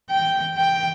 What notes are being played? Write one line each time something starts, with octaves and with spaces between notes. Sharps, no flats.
G5
G5